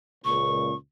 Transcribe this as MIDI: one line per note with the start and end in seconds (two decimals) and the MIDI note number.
0.25 0.72 37
0.25 0.72 46
0.25 0.75 85